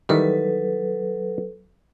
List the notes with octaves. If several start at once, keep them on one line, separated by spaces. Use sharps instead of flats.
D#3 E3 F#3 G3 A4 B4